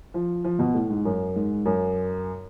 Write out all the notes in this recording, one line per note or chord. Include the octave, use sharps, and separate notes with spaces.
F3
F3
B2
A2
G#2
F#2
G#2
F#2